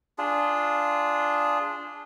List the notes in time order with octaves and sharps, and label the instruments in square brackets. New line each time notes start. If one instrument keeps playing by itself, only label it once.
[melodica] D4 F4 G#4